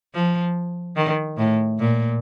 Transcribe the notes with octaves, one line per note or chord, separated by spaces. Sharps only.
F3
D#3
A2
A#2